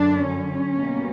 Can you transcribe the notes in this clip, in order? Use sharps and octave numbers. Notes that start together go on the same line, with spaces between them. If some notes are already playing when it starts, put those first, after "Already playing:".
Already playing: F#2 D3 F#3 D4
C#4
B2 G3 A#3